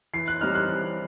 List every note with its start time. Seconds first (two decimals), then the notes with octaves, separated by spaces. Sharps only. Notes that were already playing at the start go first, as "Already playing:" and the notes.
0.13 E3 C7
0.28 F#6
0.41 G3 C4 D#4 F6
0.55 F#6
0.69 E3